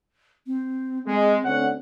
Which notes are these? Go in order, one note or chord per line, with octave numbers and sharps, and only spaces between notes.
C4
G#3 C4
D2 C#4 F#5